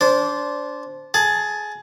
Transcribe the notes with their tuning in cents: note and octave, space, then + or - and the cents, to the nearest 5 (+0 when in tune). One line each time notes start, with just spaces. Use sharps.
D4 -20 C5 +0
G#4 +15 A5 +0